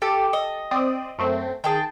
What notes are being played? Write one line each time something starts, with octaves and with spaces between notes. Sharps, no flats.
G4 A4
D#5
C4 D5 D#6
F#2 A3 C4
D#3 G#4 G5 A5